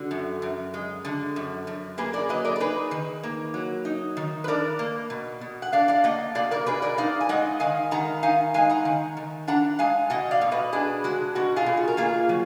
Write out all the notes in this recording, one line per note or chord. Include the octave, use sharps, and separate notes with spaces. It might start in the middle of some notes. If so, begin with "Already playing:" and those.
Already playing: D3 F#4
F#2
F#2
G#3
D3
F#2
F#2
A#3 G#4 B4
A#4 D5
F#3 B4 D#5
A#4 D5
A#4
D#4 G#4 B4
D#3
A#3
F#3
D#4
D#3
B4
D4 A#4 D5
A#3
B2
B2
F#5
D4 D5 F5
D5 F5
A#3 D#5 F#5
B2 D5 F5
A#4 D5
B2 G#4 B4
A#4 D5
D#4 D5 F5
G#5
G#3 D#5 F#5
D#3 F5 G#5
D#3 F#5 A#5
D#4 F5 G#5
G#3 F5 G#5
F#5 A#5
D#3
D#3
D4 F#5 A#5
G#3 F5 G#5
B2 D#5 F#5
D5 F5
B2
B4 D#5
D4 G#4 B4
G#3 F#4
B2 F#4
F4 G#4
B2
F#4
A#4
A#3 F4 G#4
F#3